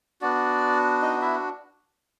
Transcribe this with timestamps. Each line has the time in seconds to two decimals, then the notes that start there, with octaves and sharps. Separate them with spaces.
0.21 B3 D4 F#4 D5
1.02 D#4 D#5
1.22 E4 E5